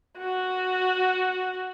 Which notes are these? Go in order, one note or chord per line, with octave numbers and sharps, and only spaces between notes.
F#4